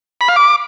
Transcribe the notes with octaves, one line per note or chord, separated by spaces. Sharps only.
B5
F5
D6